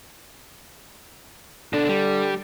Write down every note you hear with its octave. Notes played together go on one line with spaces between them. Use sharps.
B2 D3 D4
G3